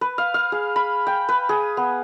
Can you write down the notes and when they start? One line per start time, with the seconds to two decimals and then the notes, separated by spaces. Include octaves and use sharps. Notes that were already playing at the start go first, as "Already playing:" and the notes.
0.01 B4
0.18 F5
0.34 F5
0.52 G#4
0.76 B5
1.07 G5
1.29 B4
1.49 G#4
1.77 B3